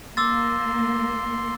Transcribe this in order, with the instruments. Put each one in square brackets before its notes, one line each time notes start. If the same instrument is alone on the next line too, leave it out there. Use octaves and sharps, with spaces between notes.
[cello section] A#3 [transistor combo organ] C6 [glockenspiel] D6 E6 A6